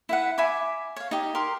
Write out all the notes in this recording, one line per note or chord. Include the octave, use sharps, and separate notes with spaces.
E4 B4 F#5
E5 G#5 B5 D6
C#5 F5
D#4 G4
G4 A#4 C6